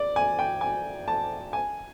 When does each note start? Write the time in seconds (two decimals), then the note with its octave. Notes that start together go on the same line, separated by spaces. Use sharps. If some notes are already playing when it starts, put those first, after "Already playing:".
Already playing: D5
0.16 G#5
0.39 G5
0.61 G#5
1.08 A5
1.53 G#5